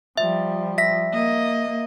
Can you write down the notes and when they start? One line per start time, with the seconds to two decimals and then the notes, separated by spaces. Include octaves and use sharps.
0.17 F3 G3 E5
0.78 E5 A#6 B6
1.13 A#3 D#5